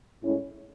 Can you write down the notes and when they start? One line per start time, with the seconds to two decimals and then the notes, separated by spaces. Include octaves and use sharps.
0.22 A2 G#3 C#4 E4